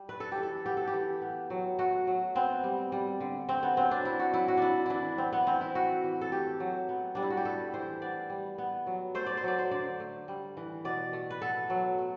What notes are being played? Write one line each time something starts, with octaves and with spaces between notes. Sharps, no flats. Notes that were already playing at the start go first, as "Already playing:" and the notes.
Already playing: G3
A3 B4
A4
G4
E3
A4
B3 G4
A4
G4
E3
B3
F#3
A3 F#4
F#3
B3 C4
G3
G3
D3
A3 C4
B3
F#3 C4
D4
A3 E4
F#4
F#3 E4
F#4
A3 D4 E4
E3 D4 E4
B3 C4
B3
E3 C4
E4
A3 F#4
E3
A4
A3 G4
F#3
B3
G3 D4
E4
F#4
G4
A3 A4
E3 C5
B3 D5
G3
B3
F#3
A3 C5
D5
C5
F#3 D5
C5
D3 D5
A3
G3
E3
B2 D5
A3
B4
B3 A4
F#3
A3